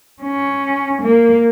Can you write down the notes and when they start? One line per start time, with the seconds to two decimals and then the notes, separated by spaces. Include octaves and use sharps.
0.23 C#4
1.02 A#3